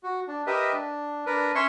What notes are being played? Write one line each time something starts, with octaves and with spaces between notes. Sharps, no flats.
F#4
D4
G4 A#4 B4 D#5 E5
D4
D4 A#4 B4
C#4 C#5 E5 C6 C#6